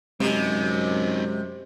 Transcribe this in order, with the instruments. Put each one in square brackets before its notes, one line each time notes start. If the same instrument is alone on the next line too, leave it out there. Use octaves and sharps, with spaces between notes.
[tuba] F#2 [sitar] C3 [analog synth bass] G#3 [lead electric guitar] C4 D#4